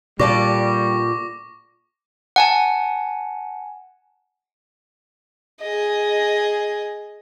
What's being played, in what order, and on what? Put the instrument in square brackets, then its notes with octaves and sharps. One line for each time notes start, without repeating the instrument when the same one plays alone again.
[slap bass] A#2 [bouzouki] D3 D5 A5 [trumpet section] G3 [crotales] C#6 D6 A#6
[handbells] F#5 G#5 A5
[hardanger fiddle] G#4 D#5